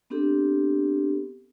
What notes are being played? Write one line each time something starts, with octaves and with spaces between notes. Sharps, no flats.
B3 C4 D4 G4 A4